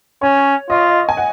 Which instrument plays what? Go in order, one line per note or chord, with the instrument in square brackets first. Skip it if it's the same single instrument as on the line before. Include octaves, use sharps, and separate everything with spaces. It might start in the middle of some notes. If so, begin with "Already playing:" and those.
[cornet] C#4 [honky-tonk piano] C#5
[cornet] F4 [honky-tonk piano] D#5
[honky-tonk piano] G#5
F#5